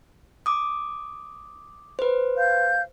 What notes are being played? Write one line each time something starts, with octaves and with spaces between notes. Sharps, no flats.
D6 D#6
B4 C5
C#5 F5 G6